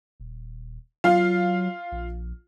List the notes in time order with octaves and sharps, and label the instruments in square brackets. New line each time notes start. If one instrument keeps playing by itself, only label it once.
[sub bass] D#1
[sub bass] F#3 [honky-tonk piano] F4 F5
[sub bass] A#1